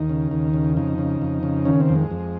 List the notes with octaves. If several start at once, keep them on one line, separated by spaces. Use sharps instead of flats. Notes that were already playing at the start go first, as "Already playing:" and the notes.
Already playing: D#2 D#4
C#3
D#2
C#3
F2 D#4
C#3
F2
C#3
D#3 C#4
C4
F2
G#3
F2